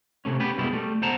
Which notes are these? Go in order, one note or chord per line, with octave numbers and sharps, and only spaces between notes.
C3 A3 C#4
B3 C#4 G4 B4
C2 F#2 B2 G3 G#3 E4
G3 A3
C#2 B2 C5 F#5 A5 A#5